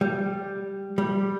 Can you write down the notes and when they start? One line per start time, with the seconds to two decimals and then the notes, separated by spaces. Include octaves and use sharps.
0.01 G3
0.98 G3